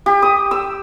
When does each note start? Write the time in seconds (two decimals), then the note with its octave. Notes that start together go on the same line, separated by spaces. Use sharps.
0.06 G4
0.22 D#6
0.51 E6